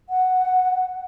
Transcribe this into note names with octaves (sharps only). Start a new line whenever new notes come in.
F#5